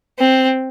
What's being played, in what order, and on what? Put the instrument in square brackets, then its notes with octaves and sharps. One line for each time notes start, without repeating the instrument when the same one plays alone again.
[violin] C4